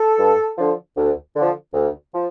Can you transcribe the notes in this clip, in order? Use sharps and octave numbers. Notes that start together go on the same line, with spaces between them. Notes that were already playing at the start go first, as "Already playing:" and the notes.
Already playing: A4
G2
D3 F3
D2
D3 F3
D2
F3